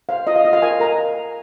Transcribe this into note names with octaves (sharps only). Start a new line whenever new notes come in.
C5 F5
F4 D#5
F5
F4 D#5
F5
A#4 G#5
A#4 A#5